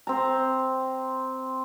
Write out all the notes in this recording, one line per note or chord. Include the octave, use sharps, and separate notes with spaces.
C4 A#5